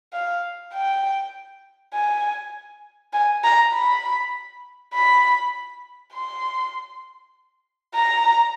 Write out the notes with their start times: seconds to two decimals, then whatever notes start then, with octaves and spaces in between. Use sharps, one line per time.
0.13 F5
0.73 G5
1.93 G#5
3.13 G#5
3.44 A#5
3.73 B5
4.94 B5
6.14 C6
7.95 A#5